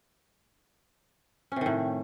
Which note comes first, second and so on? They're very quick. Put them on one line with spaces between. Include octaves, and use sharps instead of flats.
C#4 C3 D#3 A2